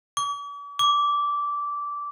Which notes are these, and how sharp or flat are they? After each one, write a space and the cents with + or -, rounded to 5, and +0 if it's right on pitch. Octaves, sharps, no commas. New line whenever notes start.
D6 -45
D6 -15